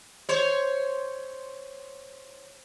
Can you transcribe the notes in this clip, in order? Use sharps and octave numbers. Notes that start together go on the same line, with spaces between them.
C5 C#5